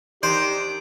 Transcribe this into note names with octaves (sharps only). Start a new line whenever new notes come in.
D#3 D4 D#4 G4 C5 D7